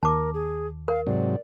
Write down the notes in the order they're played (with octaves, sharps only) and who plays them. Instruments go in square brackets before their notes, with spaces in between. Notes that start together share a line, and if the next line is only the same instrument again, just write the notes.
[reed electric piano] D#2 [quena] A#4 [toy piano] A5 D6
[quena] G#4
[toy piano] A#4 [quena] F5
[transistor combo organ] G#2 C3 F#3 [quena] D5